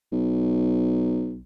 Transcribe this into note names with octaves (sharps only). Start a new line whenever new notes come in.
B1